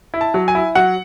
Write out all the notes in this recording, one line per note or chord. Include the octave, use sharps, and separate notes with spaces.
E4
A5
F#3
G#5
E4
F#3 F#5